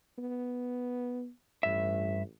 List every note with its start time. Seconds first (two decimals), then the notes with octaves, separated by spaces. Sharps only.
0.18 B3
1.63 A1 G2 E5